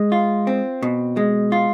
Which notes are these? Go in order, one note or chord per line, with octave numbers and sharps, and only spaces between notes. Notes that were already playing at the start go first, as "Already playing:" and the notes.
Already playing: G#3
F4
C4
B2
G#3
F4